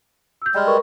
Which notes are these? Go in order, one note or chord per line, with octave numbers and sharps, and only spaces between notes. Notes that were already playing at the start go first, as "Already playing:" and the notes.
E6 G6
G3 G#3 G5 F6
A#4 B4 C#6